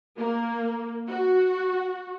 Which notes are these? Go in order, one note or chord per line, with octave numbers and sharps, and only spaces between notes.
A#3
F#4